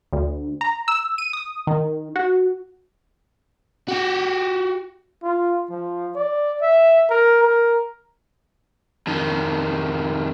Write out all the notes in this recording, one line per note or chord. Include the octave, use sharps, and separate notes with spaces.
D2
A#5
E6
D#7
D#6
D#3
F#4
F#4 G4
F4
F3
D5
E5
A#4
A#4
F2 D#3